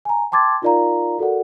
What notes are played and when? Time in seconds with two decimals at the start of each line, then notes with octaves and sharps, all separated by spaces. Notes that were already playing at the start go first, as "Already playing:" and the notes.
0.05 G#5 A#5
0.32 G5 A5 C6 D6 G#6 A6
0.62 D#4 F4 A#4 D5 F5 A#5
1.19 F#4 A4 A#4 D5 F#5